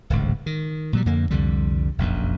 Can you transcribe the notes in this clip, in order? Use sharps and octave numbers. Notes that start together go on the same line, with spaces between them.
D1 G#1 C#2
D#3
A#2 F#3 G3
F2 D3 A#3
C2 F2 D3 G3
F1 A#1 F#2